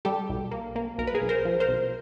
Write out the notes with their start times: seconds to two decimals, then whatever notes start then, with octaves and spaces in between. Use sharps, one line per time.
0.05 G3 G4 A4
0.29 B1
0.51 A#3
0.76 A#3
0.98 B1 A#4
1.07 B4
1.15 G#4 A#4
1.22 B1
1.29 A#4 C5
1.45 F3
1.60 A#4 C5
1.69 B1